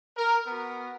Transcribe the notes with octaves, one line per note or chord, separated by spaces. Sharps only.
A#4
B3 F#4